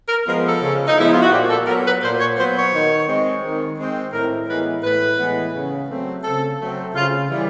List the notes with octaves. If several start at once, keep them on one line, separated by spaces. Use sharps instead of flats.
A#4
F3 G#3 B3 A#4
A4
C#3
D#4
F3 G#3 B3 E4
F4
F#4
A#2 G4
A4
F#3 B3 A#4
B4
A#2 C5
C#5
F#3 B3 C5
C#5
D#3
G#3 C4
D#3
G#3 C4
A2 A#4
E3 G#3 B3 B4
A2 B4
E3 G#3 B3
C#3
F#3 A3 C4
C#3 A4
F#3 A3 C4
C#3 F4
E3 G3